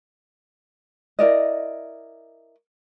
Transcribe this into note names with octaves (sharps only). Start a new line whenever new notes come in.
E4 A#4 D5 D#5